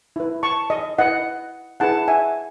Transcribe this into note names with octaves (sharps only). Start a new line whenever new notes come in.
E4 B4
A5 C#6
D#5
E4 B4 D#5 F#5
E4 G#4 B4 F#5 A5
E5 G#5